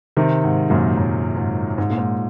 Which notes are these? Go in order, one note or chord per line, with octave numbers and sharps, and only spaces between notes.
C3 D#3
G#2
F#2 A#2
F#2
G#2
G#2
A#2
G#2